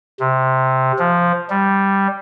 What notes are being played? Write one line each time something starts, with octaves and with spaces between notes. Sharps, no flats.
C3
F3
G3